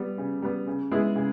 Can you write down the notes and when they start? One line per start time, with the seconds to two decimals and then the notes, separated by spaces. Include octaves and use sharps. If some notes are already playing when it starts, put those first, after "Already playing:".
Already playing: G3 B3
0.18 C#3
0.42 G3 B3
0.67 C#3
0.91 G#3 B3 E4 G#4
1.16 C#3